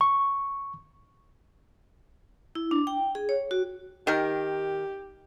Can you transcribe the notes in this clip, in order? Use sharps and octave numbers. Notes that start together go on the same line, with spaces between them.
C#6
E4
D4
G5
G#4
C#5
F#4
D#3 G4 A#4